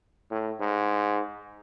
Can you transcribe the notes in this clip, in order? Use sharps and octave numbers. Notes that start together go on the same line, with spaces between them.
A2
G#2